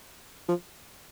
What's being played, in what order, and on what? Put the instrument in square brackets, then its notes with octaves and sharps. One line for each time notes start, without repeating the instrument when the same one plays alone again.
[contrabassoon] F3